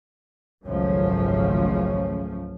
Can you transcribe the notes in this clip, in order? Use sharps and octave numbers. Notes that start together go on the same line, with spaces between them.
G#1 C#2 F#2 F3 A3 C#4